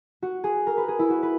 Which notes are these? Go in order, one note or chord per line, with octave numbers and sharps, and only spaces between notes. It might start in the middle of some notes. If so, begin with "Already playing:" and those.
F#4
G#4
A#4
B4
G#4
E4
F#4
B4